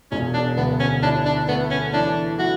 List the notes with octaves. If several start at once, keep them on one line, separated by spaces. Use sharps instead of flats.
E1 C#4
D4
D2 B3
C#4
D4 E4
D4
A3 B3
C#4
E3 D4
E3 F#4